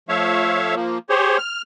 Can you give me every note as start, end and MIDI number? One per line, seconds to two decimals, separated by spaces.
0.09 0.75 53
0.09 0.75 57
0.09 0.75 73
0.09 0.75 76
0.09 0.75 77
0.75 0.98 53
0.75 0.98 58
1.10 1.38 67
1.10 1.38 68
1.10 1.38 72
1.10 1.38 73
1.38 1.62 89